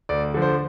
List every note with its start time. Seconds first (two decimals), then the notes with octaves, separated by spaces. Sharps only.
0.09 D2 D5
0.34 D3 F3
0.42 C5